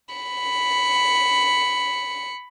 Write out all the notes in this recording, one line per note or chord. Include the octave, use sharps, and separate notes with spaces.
B5 C#7